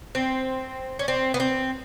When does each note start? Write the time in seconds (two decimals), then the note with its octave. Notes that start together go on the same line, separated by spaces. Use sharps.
0.15 C4
0.99 C#4
1.08 C4
1.34 B3
1.40 C4